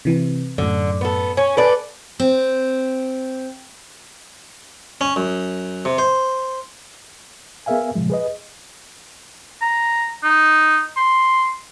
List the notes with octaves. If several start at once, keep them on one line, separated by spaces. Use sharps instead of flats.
C3 E3
F#2 A2 D3
B3 A4
C#4 G#5
A4 B4 D5
C4
C#4
F#2
C3
C5
B3 G#4 A#4 E5 F5 G#5
A#2 C#3 F3 G#3
G#4 B4 D#5
A#5
D#4
C6